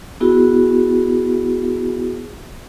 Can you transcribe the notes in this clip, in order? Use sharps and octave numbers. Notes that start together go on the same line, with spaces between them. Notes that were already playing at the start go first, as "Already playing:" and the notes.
B3 E4 F#4 G#4